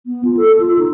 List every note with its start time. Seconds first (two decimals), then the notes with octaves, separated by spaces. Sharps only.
0.06 B3
0.25 F4
0.37 A4
0.60 F4
0.79 D#4